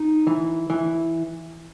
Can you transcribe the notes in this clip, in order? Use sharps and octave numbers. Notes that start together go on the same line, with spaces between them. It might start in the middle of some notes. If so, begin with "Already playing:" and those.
Already playing: D#4
E3
E3